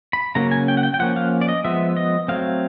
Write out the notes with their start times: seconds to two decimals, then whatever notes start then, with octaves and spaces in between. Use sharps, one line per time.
0.13 B5
0.35 C#3 F#3 A#3 C#4 A#5
0.51 G#5
0.68 G5
0.77 F#5
0.83 G5
0.94 G5
0.99 F3 A#3 C#4 F#5
1.16 F5
1.41 D5
1.48 D#5
1.64 F3 G#3 B3 E5
1.97 D#5
2.28 F#3 A3 C4 F5